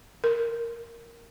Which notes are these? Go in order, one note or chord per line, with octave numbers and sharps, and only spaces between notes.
A#4